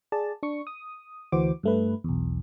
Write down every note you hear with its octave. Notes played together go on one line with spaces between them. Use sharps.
G#4 D5 A5
D4 C#6
D#6
D2 E3 F#4 C5 D6
G2 A3 B4
B1 E2